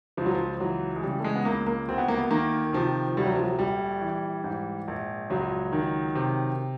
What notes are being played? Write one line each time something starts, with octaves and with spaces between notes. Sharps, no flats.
C#2 F3
F#3
F3
E3 F#3
G#3
C#3 G3
A3
G#3
B3
C#2 A#3
A#3
D2 C4
B3
A#3
B3
D#3 A#3
C3 F3
D2 G3
F#3
F3
F#3
A#1 G3
E3
G#2
A#1
C#2 F#3
D#3
C3